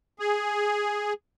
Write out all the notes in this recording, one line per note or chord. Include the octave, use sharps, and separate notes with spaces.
G#4